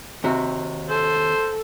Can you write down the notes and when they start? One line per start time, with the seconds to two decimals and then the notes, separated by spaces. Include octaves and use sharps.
0.24 D#2 C3 F#4
0.89 A4 C5